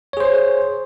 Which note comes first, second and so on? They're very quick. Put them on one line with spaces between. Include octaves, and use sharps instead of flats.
C#5 G#4 C5